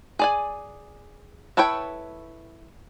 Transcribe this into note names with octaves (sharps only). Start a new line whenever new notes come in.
G#4 D5 G#5
E4 A4 B4 C#5 G5